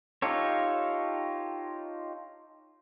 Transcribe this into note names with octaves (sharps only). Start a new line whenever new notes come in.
D#4 F4 G4 A4 C#5